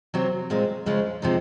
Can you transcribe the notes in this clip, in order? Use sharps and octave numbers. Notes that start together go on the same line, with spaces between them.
C3 F#3 C4 F#4
A#2 G#3 C4
C#3 F3 G#3 C#4
C3 F3 G#3 D#4